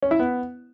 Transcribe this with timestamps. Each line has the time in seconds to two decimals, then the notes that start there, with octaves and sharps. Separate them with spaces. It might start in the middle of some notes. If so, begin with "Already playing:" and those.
0.02 C#4
0.11 E4
0.20 B3